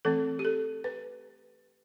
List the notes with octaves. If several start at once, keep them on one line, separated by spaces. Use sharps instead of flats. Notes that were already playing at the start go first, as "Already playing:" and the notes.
E3 A3 C4 A4
G4
A4
B4